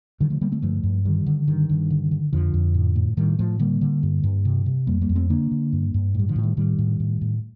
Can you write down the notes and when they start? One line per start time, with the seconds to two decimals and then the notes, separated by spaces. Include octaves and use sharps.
0.20 D3 D#3 G3
0.30 F3 A3
0.41 D3 G3 A#3
0.52 A3 C4
0.62 G2 F3 A3
0.83 G2
1.05 D3 D#3 G3
1.26 D3
1.48 G2 D#3
1.69 G2
1.90 D3
2.11 D3
2.33 F2 D3 F3
2.54 F2
2.74 A2
2.96 A2
3.17 A2 D#3 G3
3.39 A2 F3 A3
3.59 D3 G3 A#3
3.81 D3
4.03 G2
4.24 G2
4.45 C3
4.66 C3
4.87 F2 G3 A#3
5.01 G3 A#3
5.09 F2
5.16 A3 C4
5.30 D3 A#3 D4
5.51 D3
5.73 G2
5.94 G2
6.14 A2 G3
6.29 D3 F3
6.36 A2
6.43 D#3 G3
6.57 A2 D#3 G3
6.78 A2
7.00 A2
7.21 A2